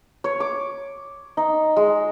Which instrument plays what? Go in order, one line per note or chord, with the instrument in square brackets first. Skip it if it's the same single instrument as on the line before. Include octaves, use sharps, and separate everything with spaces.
[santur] C#5
D6
D#4
G#3